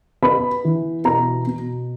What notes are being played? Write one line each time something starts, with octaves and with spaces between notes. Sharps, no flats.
B3 B5
E3
B2 A#5
B2